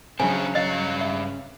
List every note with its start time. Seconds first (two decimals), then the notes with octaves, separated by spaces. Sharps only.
0.20 C#3 F#3 D4 G#4 C5 G#5
0.55 G2 D#5 F5
1.01 E5